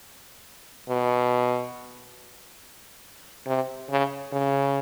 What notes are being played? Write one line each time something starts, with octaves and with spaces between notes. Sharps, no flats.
B2
C3
C#3
C#3